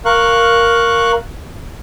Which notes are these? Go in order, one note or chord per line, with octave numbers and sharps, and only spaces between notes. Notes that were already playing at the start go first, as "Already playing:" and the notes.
A#4 F5 C#6 F#6